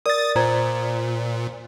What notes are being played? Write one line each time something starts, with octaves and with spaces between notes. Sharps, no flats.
A#4 D5 D#6 A6
A#2 C5 A#5 G#6